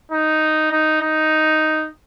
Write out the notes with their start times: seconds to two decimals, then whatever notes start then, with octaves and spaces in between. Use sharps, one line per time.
0.12 D#4
0.72 D#4
1.02 D#4